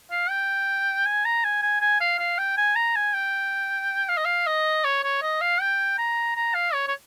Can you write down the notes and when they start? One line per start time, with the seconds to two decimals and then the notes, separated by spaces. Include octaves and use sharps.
0.11 F5
0.30 G5
1.06 G#5
1.25 A#5
1.44 G#5
1.62 G#5
1.81 G#5
2.01 F5
2.19 F5
2.39 G5
2.57 G#5
2.76 A#5
2.96 G#5
3.14 G5
4.09 F5
4.17 D#5
4.25 F5
4.47 D#5
4.85 C#5
5.04 C#5
5.22 D#5
5.41 F5
5.61 G5
5.98 A#5
6.36 A#5
6.54 F5
6.74 C#5
6.88 C#5